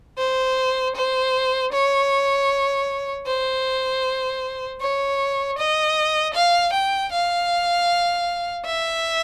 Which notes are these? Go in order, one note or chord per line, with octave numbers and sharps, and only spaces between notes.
C5
C5
C#5
C5
C#5
D#5
F5
G5
F5
E5